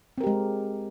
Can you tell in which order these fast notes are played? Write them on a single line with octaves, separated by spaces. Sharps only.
C4 A#4 G4 G#3